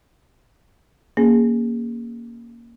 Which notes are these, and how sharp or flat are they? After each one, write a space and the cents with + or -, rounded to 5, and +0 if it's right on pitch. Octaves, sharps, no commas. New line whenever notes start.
A#3 +5 C#4 +0 G#4 -20